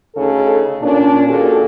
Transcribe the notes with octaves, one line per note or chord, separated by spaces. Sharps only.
D2 C#3 D#4 A4
A#2 C#4 D4
D#2 A#2 F#4 G#4 A4